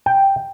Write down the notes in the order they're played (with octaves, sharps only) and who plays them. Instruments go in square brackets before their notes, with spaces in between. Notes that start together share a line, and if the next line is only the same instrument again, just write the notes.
[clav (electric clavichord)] G5